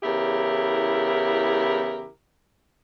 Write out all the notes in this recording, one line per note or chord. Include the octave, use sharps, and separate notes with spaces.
E2 C#3 E4 G4 A#4